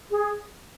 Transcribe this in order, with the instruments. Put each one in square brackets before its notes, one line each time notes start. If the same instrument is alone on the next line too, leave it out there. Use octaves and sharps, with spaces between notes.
[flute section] G#4